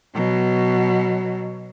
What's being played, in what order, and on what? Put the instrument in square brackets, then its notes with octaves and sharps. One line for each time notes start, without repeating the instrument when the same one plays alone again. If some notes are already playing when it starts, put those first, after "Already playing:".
[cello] B2 F#3